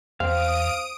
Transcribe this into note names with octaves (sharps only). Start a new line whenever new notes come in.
E2 C4 F5 D#6 D7